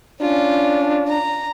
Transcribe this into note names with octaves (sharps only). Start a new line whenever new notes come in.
C#4 D4 F4
A#5